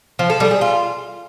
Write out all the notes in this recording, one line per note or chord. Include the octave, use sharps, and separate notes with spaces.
F3
A4
G3
G#4
F4